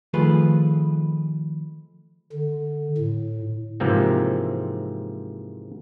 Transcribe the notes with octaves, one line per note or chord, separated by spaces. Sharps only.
D#3 F3 A3 F4 G#4 B4
D3
A2
G#2 C3 E3 F3 A#3 C4